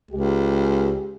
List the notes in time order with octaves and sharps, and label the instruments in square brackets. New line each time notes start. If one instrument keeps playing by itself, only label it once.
[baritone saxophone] C#2 [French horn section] G#3 G4